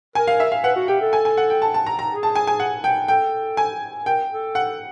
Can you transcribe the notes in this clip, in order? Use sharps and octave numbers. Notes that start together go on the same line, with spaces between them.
A#4 G#5
F5
E5
F5
B4 F#5
F#4
G4 G5
A4
G#5
G#5
F#5
G5
A5
A5
A#5
A#5
G#4
A5
G#5
G#5
F#5
G5
A4 G5
G#5
A#4 G5
A4
F#5